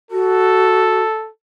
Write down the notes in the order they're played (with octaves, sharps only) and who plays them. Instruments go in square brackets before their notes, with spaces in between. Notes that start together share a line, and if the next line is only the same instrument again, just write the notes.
[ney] F#4 [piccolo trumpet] A4